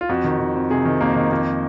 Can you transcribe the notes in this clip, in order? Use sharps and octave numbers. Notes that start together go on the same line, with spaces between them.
F4
F2 F#4
D#3
D#3
F2
C3 G#4
D#3
F2 A#3
D#3
F2 A#3